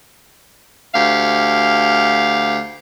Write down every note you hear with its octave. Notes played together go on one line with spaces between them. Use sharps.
D2 G4 F5